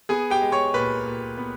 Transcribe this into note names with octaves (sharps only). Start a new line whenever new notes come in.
B3 G#4 G#5
G4 G5
G#3
C#5 C#6
A#2 B4 B5
A#2
B3